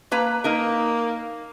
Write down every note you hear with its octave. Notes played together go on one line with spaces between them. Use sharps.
A#3 B4 A#5
A#3 D#4 A#4